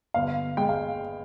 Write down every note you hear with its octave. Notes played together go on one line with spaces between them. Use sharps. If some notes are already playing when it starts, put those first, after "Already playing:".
G1 F5
G#3 G5
F5